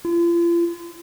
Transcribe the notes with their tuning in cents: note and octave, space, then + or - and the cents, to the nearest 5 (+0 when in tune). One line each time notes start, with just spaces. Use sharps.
F4 -40